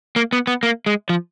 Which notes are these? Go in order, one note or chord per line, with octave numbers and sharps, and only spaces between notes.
A#3
B3
B3
A#3
G#3
F3